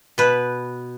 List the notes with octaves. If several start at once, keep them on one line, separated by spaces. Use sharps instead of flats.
B2 B4